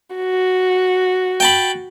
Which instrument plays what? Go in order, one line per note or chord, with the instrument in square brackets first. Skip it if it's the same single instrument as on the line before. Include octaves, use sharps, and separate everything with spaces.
[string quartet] F#4
[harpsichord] G5 A5 B5